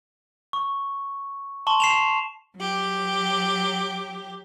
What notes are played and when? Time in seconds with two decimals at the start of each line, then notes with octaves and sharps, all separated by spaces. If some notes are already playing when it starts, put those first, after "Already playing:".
0.53 C#6
1.67 A5 C6 C#6
1.80 C7 E7 F7
2.56 F#3 G4